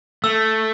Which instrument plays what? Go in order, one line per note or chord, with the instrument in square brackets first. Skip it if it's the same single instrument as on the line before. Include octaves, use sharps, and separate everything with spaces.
[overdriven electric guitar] A3 [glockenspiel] E6